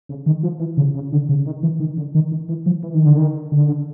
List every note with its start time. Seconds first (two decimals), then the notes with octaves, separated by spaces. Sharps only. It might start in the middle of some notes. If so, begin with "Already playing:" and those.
0.09 C#3
0.26 D#3
0.43 F3
0.60 E3
0.77 C#3
0.95 C#3
1.12 D3
1.29 C#3
1.46 D#3
1.63 E3
1.80 D#3
1.97 D3
2.15 D#3
2.32 D#3
2.49 E3
2.66 F3
2.83 E3
2.95 D#3
3.06 D3
3.17 D#3
3.52 D3